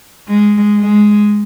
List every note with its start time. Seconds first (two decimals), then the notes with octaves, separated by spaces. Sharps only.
0.29 G#3
0.81 G#3